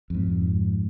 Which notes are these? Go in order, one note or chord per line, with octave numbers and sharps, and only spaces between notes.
F2 G#2